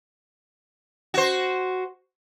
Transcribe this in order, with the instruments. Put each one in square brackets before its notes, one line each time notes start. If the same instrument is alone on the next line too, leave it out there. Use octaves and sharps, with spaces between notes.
[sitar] F#4 C5